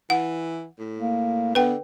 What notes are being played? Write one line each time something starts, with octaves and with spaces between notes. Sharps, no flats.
E3 F#5
A2
A#3
D3 B3 B4 G5